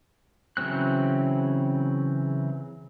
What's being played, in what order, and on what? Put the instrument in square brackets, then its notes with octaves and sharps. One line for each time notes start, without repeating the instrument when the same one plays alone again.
[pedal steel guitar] C#3 E3 F#3 C4 F#6